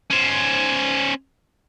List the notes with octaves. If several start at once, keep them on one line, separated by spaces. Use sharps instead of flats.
C#4 C5